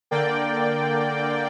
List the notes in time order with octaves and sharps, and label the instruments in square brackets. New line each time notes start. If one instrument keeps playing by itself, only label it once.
[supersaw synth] D3 A#3 D5 G5